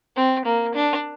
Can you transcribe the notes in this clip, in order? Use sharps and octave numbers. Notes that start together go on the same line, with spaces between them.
C4
A#3
D4